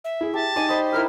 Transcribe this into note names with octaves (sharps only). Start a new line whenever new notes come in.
E5
E4 G#4
G4 A5
D#4 D5 G#5
C5 D#5 B5
E4 A#4 B5 F6